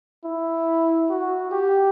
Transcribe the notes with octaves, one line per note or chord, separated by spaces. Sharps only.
E4
F#4
G4